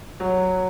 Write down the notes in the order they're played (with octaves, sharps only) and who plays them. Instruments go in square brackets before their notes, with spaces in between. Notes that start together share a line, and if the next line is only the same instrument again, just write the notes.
[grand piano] F#3